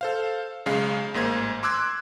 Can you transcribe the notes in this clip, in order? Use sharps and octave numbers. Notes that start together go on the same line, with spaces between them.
A4 C5 F5
B1 C#3 G#3 F5
A1 G#2 A#3 C5 G#6
C6 D6 E6 F#6 G#6